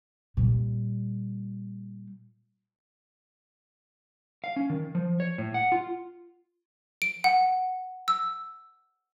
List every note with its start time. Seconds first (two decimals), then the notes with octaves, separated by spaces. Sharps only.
0.37 A#2 G3
4.44 F5
4.56 C#4
4.70 D#3
4.95 F3
5.20 C#5
5.38 A2
5.54 F#5
5.72 F4
7.02 D7
7.24 F#5
8.08 E6